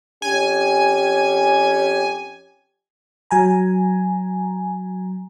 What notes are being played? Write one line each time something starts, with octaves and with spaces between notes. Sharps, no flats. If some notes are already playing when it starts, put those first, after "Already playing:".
F2 C#4 G4 G#5
F#3 G#5 A#5